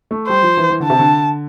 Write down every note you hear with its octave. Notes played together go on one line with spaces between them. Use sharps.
A3
G3 C5
F3
E3
E3
D3 A5
C3
D3